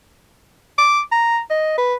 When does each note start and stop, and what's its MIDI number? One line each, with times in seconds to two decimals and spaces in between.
0.78 1.01 86
1.12 1.40 82
1.50 1.77 75
1.78 1.95 71